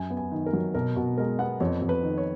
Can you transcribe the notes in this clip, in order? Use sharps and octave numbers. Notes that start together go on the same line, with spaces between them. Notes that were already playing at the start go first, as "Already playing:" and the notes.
Already playing: F#2 G#5
B3
G#5
D#3
A#4
F#3
B2 A#4
B2 F#4
G#3 A#4
B3 F#5
F2 C#5
F2
B4
D#3
C#5